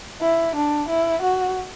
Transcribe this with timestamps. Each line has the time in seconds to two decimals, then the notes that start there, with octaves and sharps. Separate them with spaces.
0.22 E4
0.55 D4
0.88 E4
1.22 F#4